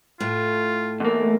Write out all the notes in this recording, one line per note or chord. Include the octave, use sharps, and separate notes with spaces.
A2 A3 F4
E2 A3 A#3